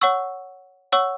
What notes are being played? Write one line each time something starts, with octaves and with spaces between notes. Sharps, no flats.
C#5 F#5 C#6 E6
C#5 F#5 C#6 E6